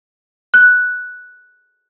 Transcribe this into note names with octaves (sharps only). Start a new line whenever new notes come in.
F#6